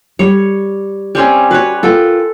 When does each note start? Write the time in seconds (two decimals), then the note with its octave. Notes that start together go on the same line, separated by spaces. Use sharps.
0.19 G3 C#5
1.15 G3 C4 C#4
1.51 F#4 B4 C#5
1.83 F4 A4 A#4 G5